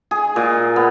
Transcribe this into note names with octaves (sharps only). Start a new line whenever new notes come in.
G#4
A#2
B3